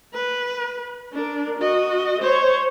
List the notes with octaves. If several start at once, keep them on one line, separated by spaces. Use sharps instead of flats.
B4
D4 A#4
F#4 D#5
C5 C#5